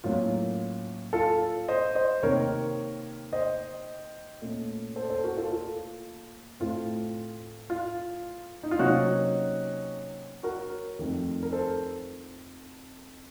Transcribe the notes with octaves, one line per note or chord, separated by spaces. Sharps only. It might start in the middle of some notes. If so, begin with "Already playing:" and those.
A2 F#3 A#3 C#4 F4
F4 A4
C5 D#5
C5 D#5
C3 D#3 A#3 A#4 C#5
C5 D#5
A#2 A3 C#4
A4 C5
A4 C5
F#4 A#4
F4 A4
F4 A4
A2 A3 C4 F4
F4
D#4
F4
C3 F#3 A#3 C#4 D#4 F#4
F#4 A#4
F2 D#3 A3
A#4
A4 C5